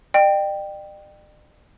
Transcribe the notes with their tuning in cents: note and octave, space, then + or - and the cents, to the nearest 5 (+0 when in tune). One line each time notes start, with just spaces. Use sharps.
D5 +45 G5 +0